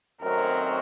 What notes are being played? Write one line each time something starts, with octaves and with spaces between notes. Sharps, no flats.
F#2 D#3 F#3 A3 C4 A#4